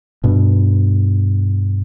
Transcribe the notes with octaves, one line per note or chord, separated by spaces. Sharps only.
G2 B2